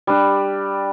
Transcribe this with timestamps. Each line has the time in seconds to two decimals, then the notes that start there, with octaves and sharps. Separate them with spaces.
0.07 G3 D4